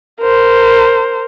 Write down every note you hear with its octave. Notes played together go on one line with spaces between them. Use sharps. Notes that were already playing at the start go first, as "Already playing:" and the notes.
A#4 C5